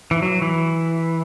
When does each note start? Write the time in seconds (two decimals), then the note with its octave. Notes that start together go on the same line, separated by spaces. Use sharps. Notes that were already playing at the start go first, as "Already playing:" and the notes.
0.11 E3
0.22 F#3
0.42 E3